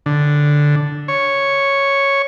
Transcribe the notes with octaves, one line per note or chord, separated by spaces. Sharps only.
D3
C#5